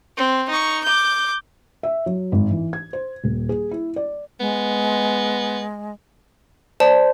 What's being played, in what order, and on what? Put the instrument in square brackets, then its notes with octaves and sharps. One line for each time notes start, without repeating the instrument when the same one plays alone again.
[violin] C4
D#4 C#6
D6 G6
[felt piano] E5
F#3
G#1
E3
G#6
C5
D#1
G#4
E4
D5
[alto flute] G#3 [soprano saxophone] B3
[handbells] C5 [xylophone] D5 A5